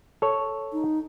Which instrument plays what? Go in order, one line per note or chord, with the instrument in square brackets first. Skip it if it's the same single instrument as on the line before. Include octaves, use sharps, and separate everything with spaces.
[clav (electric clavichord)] A4 C#5
[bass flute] D#4